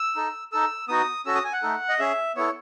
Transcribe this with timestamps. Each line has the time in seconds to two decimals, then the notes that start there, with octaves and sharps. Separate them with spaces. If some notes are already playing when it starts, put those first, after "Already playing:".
Already playing: E6
0.16 D#4 A4
0.52 D#4 A4 E6
0.88 B3 D#4 F#4 D#6
1.26 C#4 F#4 A4 E6
1.35 D#6
1.44 G#5
1.53 F#5
1.63 A3 D#4 A4
1.89 D#5
1.99 C#4 G#4 E5
2.35 B3 E4 A4 C#5